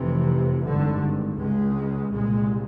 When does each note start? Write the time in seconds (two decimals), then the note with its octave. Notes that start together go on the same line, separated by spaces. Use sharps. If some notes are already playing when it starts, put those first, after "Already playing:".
Already playing: F1 F2 C3 E3
0.64 G#1 G2 D3
1.38 C#2 C#3 G#3
2.12 C2 A#2 G#3